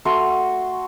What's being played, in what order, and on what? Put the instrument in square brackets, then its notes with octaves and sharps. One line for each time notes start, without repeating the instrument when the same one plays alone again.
[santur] A3 F#4 C6 C#6